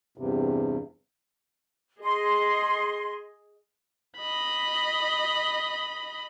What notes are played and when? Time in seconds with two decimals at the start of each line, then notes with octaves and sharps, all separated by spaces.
0.18 E2 G2 C3
2.02 G#4 D#5 C6
4.19 D#5 B5